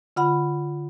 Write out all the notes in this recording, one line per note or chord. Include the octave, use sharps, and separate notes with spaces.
D3 F4 F#5 B5